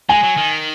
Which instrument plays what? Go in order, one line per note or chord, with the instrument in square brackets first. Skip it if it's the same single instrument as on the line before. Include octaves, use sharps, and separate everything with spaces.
[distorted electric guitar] G#3 [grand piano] G#5
[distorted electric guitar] F#3
D#3